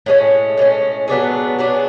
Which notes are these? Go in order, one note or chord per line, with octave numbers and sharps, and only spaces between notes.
A2 G#3 C#4
A2 G#3 C#4
F#3 B3 D4 G#4
F#3 B3 D4 G#4